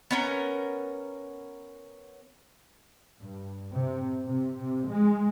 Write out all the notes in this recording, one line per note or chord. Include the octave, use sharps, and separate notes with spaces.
B3 C#4 A#4
G2
C3
C3
C3
G#3